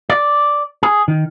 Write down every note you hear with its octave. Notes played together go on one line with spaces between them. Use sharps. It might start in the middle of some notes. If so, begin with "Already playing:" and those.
D5
G#4
D#3